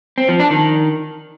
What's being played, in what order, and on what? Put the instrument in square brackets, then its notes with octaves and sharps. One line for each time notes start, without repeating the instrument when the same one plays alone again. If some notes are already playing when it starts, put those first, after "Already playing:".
[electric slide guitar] C4
F3
D4
D#3